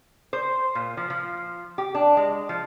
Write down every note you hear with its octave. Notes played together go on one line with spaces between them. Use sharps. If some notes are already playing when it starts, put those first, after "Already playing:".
C5
A#2
F3
F3
G4
D4
G#3
F3